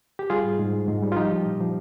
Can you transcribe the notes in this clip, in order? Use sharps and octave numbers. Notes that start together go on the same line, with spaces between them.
G4
G3 F4 G#4
G#2
G#2
G#2
G#2
G3
F4
F3 D#4 G4
F3
A#2
F3